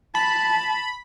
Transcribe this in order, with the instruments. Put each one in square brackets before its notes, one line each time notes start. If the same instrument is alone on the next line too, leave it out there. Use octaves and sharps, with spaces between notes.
[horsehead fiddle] A5 [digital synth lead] B5